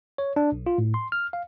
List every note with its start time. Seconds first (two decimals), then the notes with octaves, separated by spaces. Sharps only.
0.18 C#5
0.36 D4
0.52 B1
0.66 F4
0.78 A2
0.94 C6
1.12 F6
1.33 F5